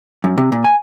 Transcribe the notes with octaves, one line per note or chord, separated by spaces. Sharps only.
F#2
C3
A#2
G#5